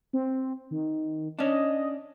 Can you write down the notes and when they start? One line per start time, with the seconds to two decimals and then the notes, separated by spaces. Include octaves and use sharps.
0.13 C4
0.71 D#3
1.39 C#4 D4 D#5